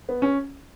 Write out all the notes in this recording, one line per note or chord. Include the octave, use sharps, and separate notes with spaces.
B3
C#4